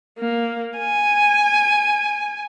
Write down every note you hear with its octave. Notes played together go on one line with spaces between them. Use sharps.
A#3
G#5